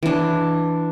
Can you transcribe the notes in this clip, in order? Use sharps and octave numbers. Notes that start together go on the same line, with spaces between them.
E3 D4